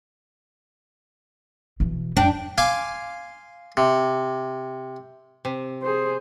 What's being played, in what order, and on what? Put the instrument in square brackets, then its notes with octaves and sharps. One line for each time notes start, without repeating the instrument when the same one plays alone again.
[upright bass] B2 E3
[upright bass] F2 [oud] D4 [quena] G5
[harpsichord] F5 G#5 C6 D6
C3
[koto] C3
[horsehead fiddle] G#4 C5